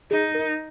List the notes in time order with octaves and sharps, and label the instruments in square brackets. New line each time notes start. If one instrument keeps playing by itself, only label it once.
[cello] D#4 [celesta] G#4
[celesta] A#4